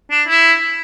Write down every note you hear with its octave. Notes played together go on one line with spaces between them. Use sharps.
D4
E4